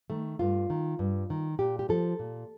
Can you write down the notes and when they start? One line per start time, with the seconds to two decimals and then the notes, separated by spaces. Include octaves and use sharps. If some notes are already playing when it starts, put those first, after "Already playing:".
0.10 D#3 A3
0.39 G2 F4
0.70 D#3
0.99 G2
1.30 D#3
1.59 A#2 G4
1.79 G4
1.89 F3 A4
2.19 A#2